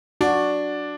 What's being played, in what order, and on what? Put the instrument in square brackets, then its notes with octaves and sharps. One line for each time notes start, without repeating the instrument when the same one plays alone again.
[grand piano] D4 [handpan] F#4